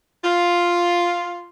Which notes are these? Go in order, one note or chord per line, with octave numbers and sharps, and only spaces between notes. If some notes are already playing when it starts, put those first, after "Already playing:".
F4